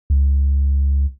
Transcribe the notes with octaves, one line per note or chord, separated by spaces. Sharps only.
C#2